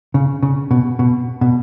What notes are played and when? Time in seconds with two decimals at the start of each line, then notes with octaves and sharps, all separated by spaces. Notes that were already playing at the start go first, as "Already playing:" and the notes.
0.14 C#3
0.43 C#3
0.71 B2
0.99 B2
1.41 B2